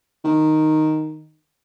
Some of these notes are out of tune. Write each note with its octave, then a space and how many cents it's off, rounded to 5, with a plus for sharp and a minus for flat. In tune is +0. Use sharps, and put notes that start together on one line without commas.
D#3 -5